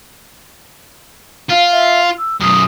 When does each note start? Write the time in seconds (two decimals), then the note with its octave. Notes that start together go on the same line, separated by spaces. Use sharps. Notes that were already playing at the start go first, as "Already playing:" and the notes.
1.50 F4 F5
1.72 E5
2.18 E6
2.41 F#2 B2 D#6